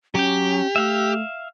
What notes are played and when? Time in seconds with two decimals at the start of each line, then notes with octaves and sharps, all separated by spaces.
0.15 F#3 C#4 G4 G5
0.76 A3 E5 F5 E6